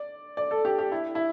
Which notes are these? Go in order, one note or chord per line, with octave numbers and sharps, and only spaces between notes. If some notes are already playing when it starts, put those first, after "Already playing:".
Already playing: D5
D5
A4
G4
G4
E4
E4